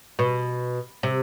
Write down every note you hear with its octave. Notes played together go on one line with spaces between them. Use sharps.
B2
C3